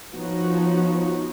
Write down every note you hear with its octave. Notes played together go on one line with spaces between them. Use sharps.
F3 B3 D#4 F#4 C#5